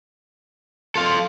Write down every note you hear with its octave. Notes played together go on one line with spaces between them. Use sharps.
F4 A4 F5